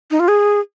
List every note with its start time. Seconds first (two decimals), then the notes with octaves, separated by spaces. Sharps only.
0.11 D#4
0.20 F4
0.29 G#4